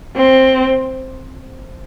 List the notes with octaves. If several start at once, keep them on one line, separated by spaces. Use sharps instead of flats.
C4